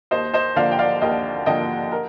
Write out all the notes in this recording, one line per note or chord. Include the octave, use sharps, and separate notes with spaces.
D#2 C5 D#5
C5 D#5
D3 F3 A#3 D5 F5
G5
D5 F5
D#2 D#5 G5
D3 F3 A#3 D#5 G5
A#4